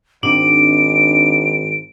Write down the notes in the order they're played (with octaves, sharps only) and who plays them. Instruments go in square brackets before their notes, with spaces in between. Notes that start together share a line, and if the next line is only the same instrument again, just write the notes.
[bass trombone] G#1 [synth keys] G#2 C4 [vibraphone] D4 [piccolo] D7